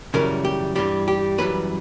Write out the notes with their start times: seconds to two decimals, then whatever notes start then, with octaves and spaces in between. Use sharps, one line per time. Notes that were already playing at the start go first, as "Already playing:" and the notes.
0.14 F#2 C#3 E3 G3 A#4
0.45 G4
0.76 G2 E3 G3 G4
1.08 G4
1.38 F#2 E3 G3 B4